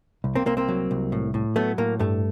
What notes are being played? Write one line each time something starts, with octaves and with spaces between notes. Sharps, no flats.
C2
A#3 C4
C2 A#3 C4
A#3 C4
F#3
C2
A2
A2
F#3 A3 B3
A2 A#3
G2 A3